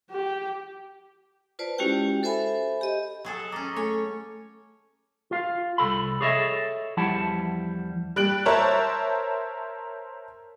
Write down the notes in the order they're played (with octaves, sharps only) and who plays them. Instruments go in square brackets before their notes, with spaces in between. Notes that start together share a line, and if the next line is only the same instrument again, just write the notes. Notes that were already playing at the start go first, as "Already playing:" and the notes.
[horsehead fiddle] G4
[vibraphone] F4 B4 C5 D5 A5
G#3 C#4 E4 F#4 G4 G5
A4 C5 E5 G#5 B5
G4 D#5
[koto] F#3 G#4 A4
[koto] C#4 D#5 [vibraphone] A#5 [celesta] D6 A6
[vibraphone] A3 A4 G#5 [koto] C#5
[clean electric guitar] F4 F5
C2 A4 B5
G#4 A4 C#5 D#5 E5
E2 F3 G3 E4 F#5 A5
[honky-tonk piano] G3 F#6 D7 F#7
A#4 C5 C#5 E5 A5 A#5